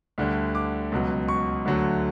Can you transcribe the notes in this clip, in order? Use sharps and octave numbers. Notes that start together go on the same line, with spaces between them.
D2 D3 G3
D6
C#2 B2 F#3
C#6
D2 D3 F#3 A3